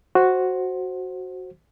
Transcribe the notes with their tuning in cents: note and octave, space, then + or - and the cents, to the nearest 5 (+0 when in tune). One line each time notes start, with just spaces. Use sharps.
F#4 +0 C5 +10